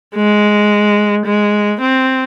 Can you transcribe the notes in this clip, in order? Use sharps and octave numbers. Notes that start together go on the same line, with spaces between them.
G#3
G#3
C4